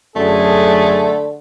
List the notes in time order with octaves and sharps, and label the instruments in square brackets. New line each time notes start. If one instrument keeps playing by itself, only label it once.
[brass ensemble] F#2 G#4 [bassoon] D3 [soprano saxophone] A3